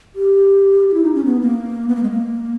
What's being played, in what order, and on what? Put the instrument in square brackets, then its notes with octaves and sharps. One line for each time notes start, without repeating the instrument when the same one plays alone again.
[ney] G4
G4
E4
D#4
C#4
B3
A#3
B3
A#3
G#3
A#3